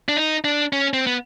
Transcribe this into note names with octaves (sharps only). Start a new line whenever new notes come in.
D4
D#4
D4
C#4
C4
B3